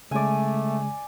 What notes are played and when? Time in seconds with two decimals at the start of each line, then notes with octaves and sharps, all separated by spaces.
0.11 C#3 G#3 A3 D5 G#5